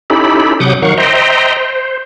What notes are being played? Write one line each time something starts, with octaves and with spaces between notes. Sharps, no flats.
C#4 D#4 E4 G4 A4 B5
C3 F#3 F#5 D6 D#6 G6
D#3 F#3 F5 F#5 C#6
C5 D#5 E5 G5 A#5 C6
C5